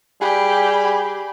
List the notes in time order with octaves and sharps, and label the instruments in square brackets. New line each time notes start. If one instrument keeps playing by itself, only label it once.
[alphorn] G3 [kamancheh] G4 [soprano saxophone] G#4 [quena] B5